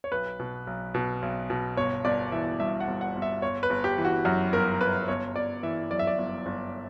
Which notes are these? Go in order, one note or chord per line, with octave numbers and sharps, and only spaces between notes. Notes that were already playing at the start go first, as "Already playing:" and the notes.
C#5
B1 B4
B2
B1
B2
B1
B2
G1 C#5
G1 D5
E3 E5
G2 E5
F#5
G1
F#5
G1
E5
G1 C#5
B4
G1
G4
E3
F#4
F#2 F#4
G1 A#4
G1 B4
G1 C#5
G1 D5
E3 E5
F#2 D5
E5
D5
G1
G1